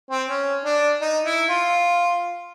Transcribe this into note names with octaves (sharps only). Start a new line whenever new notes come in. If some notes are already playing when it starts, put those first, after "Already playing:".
C4
C#4
D4
D#4
E4
F4